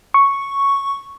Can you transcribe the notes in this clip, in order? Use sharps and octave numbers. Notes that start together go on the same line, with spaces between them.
C#6